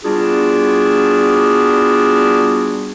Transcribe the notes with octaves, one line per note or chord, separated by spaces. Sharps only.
G3 B3 D4 F4 F#4 G#4